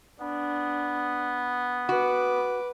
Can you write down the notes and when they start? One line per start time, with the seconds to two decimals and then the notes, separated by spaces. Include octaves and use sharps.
0.21 B3 D4
1.89 F#4 B4 D6